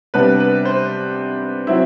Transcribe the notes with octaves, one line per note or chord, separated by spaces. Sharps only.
C3 G3 B3 D4 B4
B4
C5
F#3 C4 E4 E5